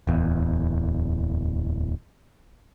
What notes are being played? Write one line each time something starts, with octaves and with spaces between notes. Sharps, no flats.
D1 E2